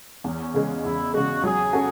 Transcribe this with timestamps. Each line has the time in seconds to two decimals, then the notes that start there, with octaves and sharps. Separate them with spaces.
0.24 E2 C#4
0.54 C#3 G#3
0.84 E2 E4
1.14 C#3 G#3 F#4
1.44 F#3 G#4
1.73 C#4 F#4 A4